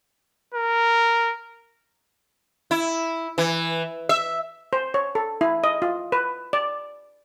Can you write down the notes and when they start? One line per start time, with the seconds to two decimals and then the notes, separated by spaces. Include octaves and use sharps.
0.54 A#4
2.71 E4
3.38 E3
4.09 E5
4.73 C5
4.94 C#5
5.15 A4
5.41 E4
5.64 D#5
5.82 F4
6.12 B4
6.53 D5